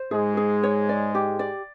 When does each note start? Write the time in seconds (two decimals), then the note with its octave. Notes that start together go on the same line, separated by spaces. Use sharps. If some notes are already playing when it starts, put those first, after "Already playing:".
Already playing: C5
0.11 G#2 G#3 G#4
0.37 G#4
0.63 C#5
0.89 D5
1.15 G4
1.39 D5